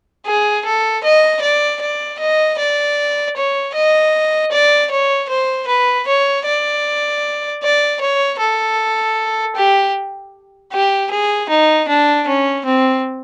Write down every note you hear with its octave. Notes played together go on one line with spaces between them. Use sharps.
G#4
A4
D#5
D5
D5
D#5
D5
C#5
D#5
D5
C#5
C5
B4
C#5
D5
D5
C#5
A4
G4
G4
G#4
D#4
D4
C#4
C4